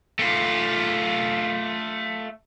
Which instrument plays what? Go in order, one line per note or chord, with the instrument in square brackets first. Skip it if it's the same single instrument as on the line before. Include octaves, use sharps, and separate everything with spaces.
[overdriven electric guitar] A3 F4